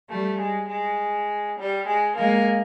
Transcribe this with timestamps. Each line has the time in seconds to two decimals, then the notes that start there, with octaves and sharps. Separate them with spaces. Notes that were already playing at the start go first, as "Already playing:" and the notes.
0.09 G3 A3
0.39 G#3
0.68 G#3
1.58 G3
1.87 G#3
2.16 G#3 A#3